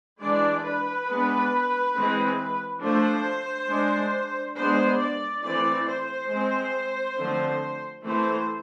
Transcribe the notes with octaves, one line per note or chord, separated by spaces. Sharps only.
E3 G#3 D4 D5
B4
G#3 B3 D4
E3 G#3 C4
F3 A3 D4 C5
G#3 D4
G#3 B3 D4 C5
D5
E3 A3 C4 D5
C5
G#3 C4
D3 F3 A3 C4
E3 A3 C4 C5